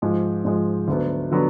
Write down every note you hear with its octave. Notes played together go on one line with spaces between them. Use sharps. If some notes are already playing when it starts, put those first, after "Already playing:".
G#2 F3 G#3
G#2 F3 G#3
D2 D3 F#3 B3
D3 F#3 B3